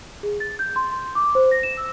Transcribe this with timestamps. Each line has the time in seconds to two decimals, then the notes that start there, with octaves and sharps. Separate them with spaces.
0.23 G#4
0.40 A6
0.59 G6
0.76 C6
0.91 C6
1.15 D6
1.35 C5
1.51 A#6
1.63 E7
1.77 E6